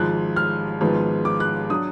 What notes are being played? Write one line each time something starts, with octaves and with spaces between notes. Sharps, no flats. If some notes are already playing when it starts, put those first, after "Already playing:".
Already playing: G#1 G#2 F3 F#6
F6
G#1 G#2 F3 B3
D6
F#6
F#3 D4 D#6